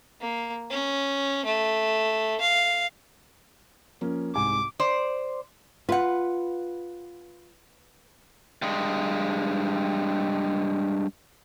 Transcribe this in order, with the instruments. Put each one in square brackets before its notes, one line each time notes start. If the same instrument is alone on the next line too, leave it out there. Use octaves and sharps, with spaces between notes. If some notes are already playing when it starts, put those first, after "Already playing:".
[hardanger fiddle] A#3
C#4
A3
F5
[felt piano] F3 A#3 C#4
[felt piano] C2 G#2 G#5 [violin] D6
[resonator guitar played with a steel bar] C5 D5
[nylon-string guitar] F4 [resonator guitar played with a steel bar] B4 F#5
[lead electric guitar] G2 G#3